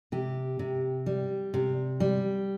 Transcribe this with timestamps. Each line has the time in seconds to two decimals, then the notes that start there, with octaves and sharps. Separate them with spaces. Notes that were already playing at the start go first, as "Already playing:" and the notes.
0.12 C3 G4
0.59 C3
1.06 G3
1.54 C3
2.00 G3